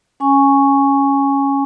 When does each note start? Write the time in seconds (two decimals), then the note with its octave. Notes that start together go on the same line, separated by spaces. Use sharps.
0.20 C#4 G#5 C#6